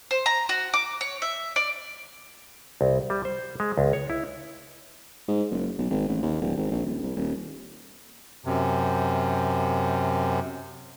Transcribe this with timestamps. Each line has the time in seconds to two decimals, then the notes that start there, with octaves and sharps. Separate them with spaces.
0.11 C5
0.26 A#5
0.49 F#4
0.74 D6
1.01 C#5
1.22 E5
1.56 D5
2.81 C2
3.10 G3
3.25 C5
3.60 G#3
3.78 C#2
3.93 C#5
4.10 E4
5.28 G#2
5.51 F#1
5.79 B1
5.90 G#1
6.08 A1
6.23 D#2
6.41 D1
6.57 G#1
6.72 A#1
6.86 D#1
7.03 C2
7.16 D#1
8.45 F#2 C3